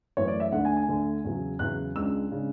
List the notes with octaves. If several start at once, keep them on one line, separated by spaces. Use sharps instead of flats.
F#2 E3 A3 C#4 C#5
D5
E5
D2 D3 A3 D4 F#5
G#5
G#5
D2 D3 A3 D4
E2 C#3 F#3
E2 C#3 F#3 F#6
C#2 C#3 G#3 D4 E6
C#3 G#3 D4